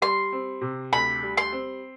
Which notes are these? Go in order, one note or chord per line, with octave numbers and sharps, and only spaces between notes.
G3 C6
C4
C3
D2 B5
G3
C6
C4